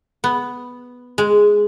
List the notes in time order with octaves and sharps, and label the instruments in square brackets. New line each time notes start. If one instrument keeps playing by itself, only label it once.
[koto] B3
G#3